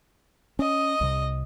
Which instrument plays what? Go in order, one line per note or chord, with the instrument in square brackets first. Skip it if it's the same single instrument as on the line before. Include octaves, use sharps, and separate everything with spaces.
[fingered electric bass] C#4 [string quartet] D#5
[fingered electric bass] C2 C3